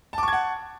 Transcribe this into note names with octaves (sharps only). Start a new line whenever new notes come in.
F#5 A5 C#6 D6 G#6